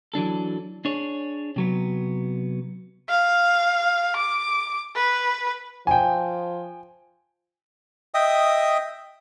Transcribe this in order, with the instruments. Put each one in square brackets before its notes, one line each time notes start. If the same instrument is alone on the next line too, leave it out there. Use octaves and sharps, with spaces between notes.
[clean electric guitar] E3 F#3 D4 A4
D4 G#4 C#5
C3 F#3 B3
[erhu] F5
D6
B4
[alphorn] F3 [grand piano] G5 G#5
[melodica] D#5 E5 G5 D#6